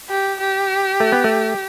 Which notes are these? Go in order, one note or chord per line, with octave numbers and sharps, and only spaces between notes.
G4
G4
A3
B3
A3